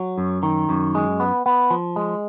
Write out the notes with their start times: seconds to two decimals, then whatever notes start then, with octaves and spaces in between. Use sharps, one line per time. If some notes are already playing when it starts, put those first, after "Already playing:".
Already playing: F#3
0.18 F#2
0.43 D#3
0.69 F#2
0.95 G#3
1.20 B3
1.46 B3
1.70 F3
1.96 G#3